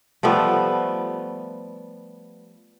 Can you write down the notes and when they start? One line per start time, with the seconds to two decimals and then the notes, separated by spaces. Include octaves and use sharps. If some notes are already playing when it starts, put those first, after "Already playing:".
0.23 F3 G3 A3 B3